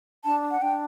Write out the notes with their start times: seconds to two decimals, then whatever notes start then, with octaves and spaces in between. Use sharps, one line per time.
0.24 D4 A5
0.51 F#5
0.61 D4 G5